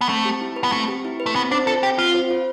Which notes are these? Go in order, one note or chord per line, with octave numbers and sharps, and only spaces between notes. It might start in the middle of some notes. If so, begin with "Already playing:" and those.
B3
A3 C4
G4
E4
B4
B3
A3 C4
G4
E4
B4
A3
B3 C4
D4 C5
F4 A4
C4 G4
C4 F4
C5
F4